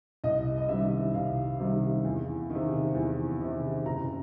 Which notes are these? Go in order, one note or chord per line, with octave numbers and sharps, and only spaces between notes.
C2 D#5
D#5
C3 D#3 G3 E5
C2 F5
C3 D#3 G3
E2
D#3
C3
E2
C3 D#3
F#1 A#5